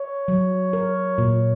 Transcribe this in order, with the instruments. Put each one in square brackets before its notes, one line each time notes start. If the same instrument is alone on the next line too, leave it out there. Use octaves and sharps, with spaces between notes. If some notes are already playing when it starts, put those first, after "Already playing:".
Already playing: [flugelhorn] C#5
[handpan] F#3
A#4
A#2